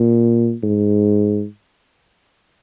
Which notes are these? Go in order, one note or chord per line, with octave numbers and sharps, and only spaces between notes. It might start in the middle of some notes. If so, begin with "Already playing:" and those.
Already playing: A#2
G#2